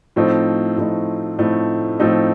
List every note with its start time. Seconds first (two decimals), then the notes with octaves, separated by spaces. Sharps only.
0.16 A2 F3 A3 C4 D#4
0.77 A2 F3 A3 C4 D#4
1.39 A2 F3 A3 C4 D#4
2.00 A2 F3 A3 C4 D#4